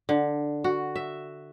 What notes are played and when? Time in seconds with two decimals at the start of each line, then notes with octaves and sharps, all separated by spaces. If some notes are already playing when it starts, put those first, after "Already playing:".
0.09 D3
0.64 F#4
0.96 E5